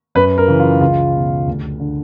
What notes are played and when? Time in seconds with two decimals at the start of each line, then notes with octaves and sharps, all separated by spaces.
0.15 F#2 B4
0.38 A#4
0.48 C#3 E3
0.60 F4
0.81 C#2 F4
1.14 B2
1.47 D2
1.80 D3